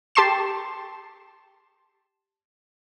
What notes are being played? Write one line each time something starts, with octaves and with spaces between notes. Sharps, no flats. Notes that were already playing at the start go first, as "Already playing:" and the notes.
G4 A5 C6 C7 E7